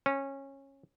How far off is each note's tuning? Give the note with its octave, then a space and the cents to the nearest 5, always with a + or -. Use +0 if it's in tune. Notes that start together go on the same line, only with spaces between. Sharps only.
C#4 -15